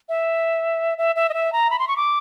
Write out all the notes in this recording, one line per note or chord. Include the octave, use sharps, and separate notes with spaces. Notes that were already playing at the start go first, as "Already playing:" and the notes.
E5
E5
E5
D#5
E5
A#5
B5
C6
C#6
D6